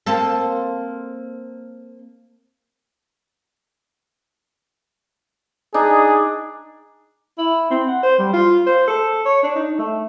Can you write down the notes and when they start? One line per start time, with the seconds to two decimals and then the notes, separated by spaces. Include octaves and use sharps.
0.06 A#3 C4 A4
5.74 D4 D#4 G#4
7.38 E4
7.71 C4
7.88 F#5
8.03 C5
8.19 G3
8.33 F4
8.67 C5
8.88 A4
9.25 C#5
9.44 D4
9.56 D#4
9.78 A3